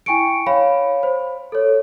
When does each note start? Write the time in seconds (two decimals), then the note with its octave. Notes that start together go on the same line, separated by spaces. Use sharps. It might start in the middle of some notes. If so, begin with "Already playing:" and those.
0.06 E4 G5 G#5 C#6 C#7 D7
0.47 C#5 F5 B5
1.03 C5
1.52 A4 C#5